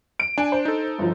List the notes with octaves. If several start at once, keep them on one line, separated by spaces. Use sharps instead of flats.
D7
D4 G#5
C5
D#4 A4
G1 F3